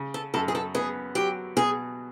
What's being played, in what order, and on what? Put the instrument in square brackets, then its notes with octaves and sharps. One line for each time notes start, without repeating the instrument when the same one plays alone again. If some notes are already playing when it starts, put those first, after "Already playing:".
Already playing: [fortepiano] C#3
[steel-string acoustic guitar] A4
[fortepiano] F#2 [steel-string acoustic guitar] A4
[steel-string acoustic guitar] G#4
A4
[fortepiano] B3 [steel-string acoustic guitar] G#4
[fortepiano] F#3 [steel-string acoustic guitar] G4
[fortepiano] B2 [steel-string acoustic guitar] G#4